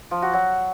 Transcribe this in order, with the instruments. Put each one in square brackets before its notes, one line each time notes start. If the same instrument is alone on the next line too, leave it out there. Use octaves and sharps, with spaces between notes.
[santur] F3
F#4
F#3